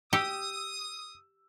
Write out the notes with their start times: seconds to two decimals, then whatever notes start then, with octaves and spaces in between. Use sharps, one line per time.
0.13 G4 D#6 E6